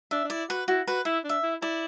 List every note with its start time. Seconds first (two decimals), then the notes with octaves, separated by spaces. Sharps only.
0.11 D4 E5
0.25 D4
0.30 E4 D5
0.50 F#4 B4
0.68 E4 F#4
0.87 F#4 B4
1.05 E4 E5
1.25 D4 E5
1.43 E4
1.62 E4 D5